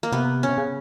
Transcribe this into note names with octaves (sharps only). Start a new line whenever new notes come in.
A#3
C3 B3
C#4
C3
C#3